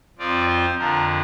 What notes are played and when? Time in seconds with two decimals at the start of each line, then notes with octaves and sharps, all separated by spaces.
0.18 F2 F3 C4 F4 D5
0.48 C5
0.78 F2 D3 F3 A#4